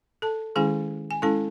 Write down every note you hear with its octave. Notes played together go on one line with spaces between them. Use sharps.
A4 A5
D#3 G#3 C#4 E4 G#4 G#5
G#5
G#3 C#4 E4 A4 A5